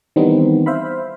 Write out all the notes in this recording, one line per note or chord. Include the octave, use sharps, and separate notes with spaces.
D#3 E3 G3 B3 C4 D#4
C5 E5 F5 B5